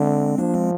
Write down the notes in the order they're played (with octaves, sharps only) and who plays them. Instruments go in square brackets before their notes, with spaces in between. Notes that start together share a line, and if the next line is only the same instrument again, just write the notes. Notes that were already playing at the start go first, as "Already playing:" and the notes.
Already playing: [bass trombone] D3 [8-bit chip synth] G#3 C4
[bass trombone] F3 [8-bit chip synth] A#3 D4
[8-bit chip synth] G#3 C4